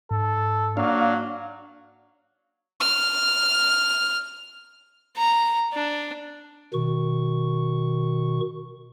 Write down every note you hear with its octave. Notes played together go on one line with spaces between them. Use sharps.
G#2 A4
F#3 A#3 D4 F5
F6
A#5
D4
B2 D#3 C#6